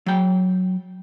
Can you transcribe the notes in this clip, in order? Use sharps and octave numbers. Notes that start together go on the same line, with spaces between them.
F#3 G5